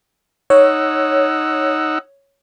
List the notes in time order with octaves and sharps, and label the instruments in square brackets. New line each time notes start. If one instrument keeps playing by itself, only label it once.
[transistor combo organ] D#4 F#5 E6 [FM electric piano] C#5